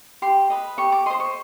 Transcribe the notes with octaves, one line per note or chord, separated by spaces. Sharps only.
G4 C6
B4 D#5
G4 C#6
D6
C5 D#5 C6
C#6